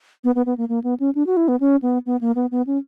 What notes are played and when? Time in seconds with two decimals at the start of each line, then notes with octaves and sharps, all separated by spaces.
0.24 B3
0.35 B3
0.46 B3
0.58 A#3
0.69 A#3
0.84 B3
1.00 C#4
1.15 D4
1.27 F#4
1.37 E4
1.48 B3
1.60 C#4
1.82 B3
2.06 B3
2.21 A#3
2.36 B3
2.51 B3
2.67 C#4